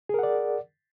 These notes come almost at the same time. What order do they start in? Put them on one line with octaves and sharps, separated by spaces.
G#4 A#4 F#5 D5